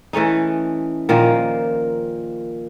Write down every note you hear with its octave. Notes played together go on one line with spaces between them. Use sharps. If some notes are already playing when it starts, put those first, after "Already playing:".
E3 A3 C#4 D#4
A#2 D#3 F3 A#3